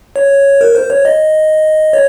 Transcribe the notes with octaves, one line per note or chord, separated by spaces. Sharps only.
C#5
A#4
C5
C#5
D#5
C#5